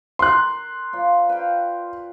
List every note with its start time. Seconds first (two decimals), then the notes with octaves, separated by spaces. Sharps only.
0.19 A#4 C6 F#6
0.93 F4 C5 D5
1.29 B4 F5 G5